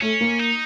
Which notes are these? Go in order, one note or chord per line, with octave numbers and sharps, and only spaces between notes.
A3 C#4
A#3
D#4